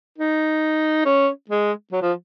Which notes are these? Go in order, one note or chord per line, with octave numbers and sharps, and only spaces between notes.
D#4
C#4
G#3
F#3
F3